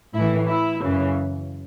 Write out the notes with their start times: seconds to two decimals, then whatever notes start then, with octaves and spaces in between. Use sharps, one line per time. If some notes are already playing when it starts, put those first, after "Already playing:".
0.15 A2 E3 E4
0.48 E4
0.81 F#2 C#3 E3